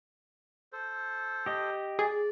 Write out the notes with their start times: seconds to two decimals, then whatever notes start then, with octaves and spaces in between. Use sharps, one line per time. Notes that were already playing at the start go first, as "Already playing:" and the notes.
0.73 A4 C5
1.46 G4 D#5
1.99 G#4 D5